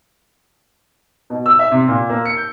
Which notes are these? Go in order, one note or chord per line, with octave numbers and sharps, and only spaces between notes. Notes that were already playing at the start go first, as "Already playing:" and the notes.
B2
E6
E5
C3
A#2
A#3
C#7
G6